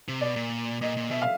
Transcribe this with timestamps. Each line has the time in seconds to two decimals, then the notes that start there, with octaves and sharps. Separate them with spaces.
0.08 C3
0.21 B2 D5
0.36 A#2
0.81 A#2 D#5
0.97 A#2
1.11 B2 E5
1.22 F5